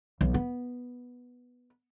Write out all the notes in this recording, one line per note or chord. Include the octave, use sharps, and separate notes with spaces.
B1
B3